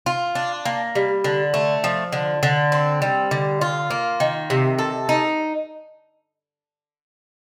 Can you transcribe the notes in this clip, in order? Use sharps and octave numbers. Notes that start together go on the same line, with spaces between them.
F4
D4
A#3
G3
D3
A3
F3
D3
D3
C4
G3
D3
F4
A#3
D#3
C3
A4
D#4